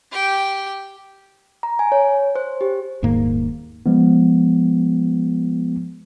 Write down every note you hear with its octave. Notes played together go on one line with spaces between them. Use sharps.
G4 G5
A#5
G#5
C#5
C5
G4
D#1 G#2 D#3 A#3
F3 G#3 B3